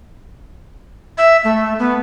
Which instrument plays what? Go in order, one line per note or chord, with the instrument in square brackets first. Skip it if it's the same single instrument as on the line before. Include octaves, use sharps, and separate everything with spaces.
[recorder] E5
A3
B3